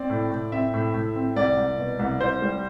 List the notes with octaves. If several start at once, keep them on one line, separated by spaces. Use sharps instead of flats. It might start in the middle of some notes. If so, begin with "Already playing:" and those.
Already playing: C4 D5
A2
A2
C4 E5
A2
A2
C4
C2 D5
C2
B2
C2
C2 C5
G3